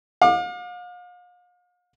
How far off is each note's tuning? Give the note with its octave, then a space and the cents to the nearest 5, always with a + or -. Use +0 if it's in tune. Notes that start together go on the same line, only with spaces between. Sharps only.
F5 +40 D6 +30